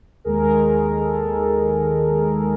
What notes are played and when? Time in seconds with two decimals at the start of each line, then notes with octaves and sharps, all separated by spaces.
0.24 D#2 D#3 G#3 G#4 A#4
0.97 A4